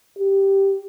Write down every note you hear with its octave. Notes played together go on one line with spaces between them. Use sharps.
G4